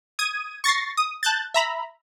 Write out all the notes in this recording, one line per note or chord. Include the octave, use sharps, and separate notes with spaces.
D#6 G#6 D#7
C#6 A6 A#6 C7
D#6
A5 F#6 G6 A6
E5 A#5 B5